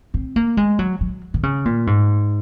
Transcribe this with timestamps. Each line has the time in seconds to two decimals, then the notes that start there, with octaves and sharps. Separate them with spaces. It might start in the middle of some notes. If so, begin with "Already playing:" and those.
0.14 C4
0.36 A#3
0.57 G#3
0.79 F#3
1.01 F#3
1.34 D#3
1.43 C#3
1.65 A#2
1.87 G#2